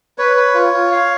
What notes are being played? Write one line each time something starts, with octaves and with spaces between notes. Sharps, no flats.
B4 C#5
B4
F4
F4
F5